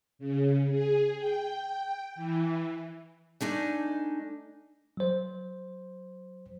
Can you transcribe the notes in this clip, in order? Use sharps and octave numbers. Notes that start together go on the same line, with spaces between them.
C#3
G#4
G5
E3
A3 D4 D#4 G#5
F#3 C5